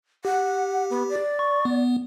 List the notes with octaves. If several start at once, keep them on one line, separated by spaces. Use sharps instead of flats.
G4 F#5
B3
D5
C#6
B3